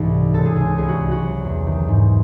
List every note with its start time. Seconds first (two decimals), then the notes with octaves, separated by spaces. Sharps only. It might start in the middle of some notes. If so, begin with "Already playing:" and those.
Already playing: C2 G#2 E3 A4
0.11 C3
0.33 C#2 A4
0.45 G#4
0.55 C#2 G#4
0.67 A4
0.78 C2 G#4
0.89 F#4
1.00 C2
1.11 F#4
1.22 F#3
1.44 E2
1.67 D#3
1.88 G#2